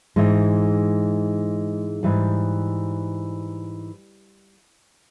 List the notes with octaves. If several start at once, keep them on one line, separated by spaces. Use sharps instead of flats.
G#2 E3 G#3
G#2 E3 G3